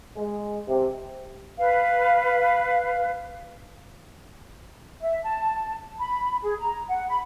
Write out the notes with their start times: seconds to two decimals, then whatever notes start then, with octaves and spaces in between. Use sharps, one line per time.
0.17 G#3
0.68 C3
1.58 B4 F5
5.01 E5
5.24 A5
6.00 B5
6.43 G#4
6.59 A#5
6.88 F#5
7.09 B5